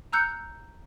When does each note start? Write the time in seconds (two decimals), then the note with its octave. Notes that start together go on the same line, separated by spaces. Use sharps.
0.13 A#5 E6 F#6 G6 C#7